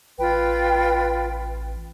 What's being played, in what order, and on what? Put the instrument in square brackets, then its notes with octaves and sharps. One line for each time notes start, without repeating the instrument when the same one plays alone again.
[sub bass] A1 [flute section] F4 B4 G5